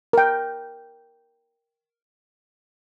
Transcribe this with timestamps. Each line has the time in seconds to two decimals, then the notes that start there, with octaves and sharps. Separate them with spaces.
0.13 A#4 G5